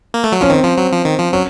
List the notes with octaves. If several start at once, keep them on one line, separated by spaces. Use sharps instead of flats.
A#3
A3
F#3
F3 C#4
D#3 C4
F3
F#3
F3
D#3
F3
F#3 C#4